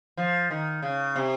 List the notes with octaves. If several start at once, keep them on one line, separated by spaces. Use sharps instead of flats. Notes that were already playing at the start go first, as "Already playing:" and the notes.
F3
D#3
C#3
C3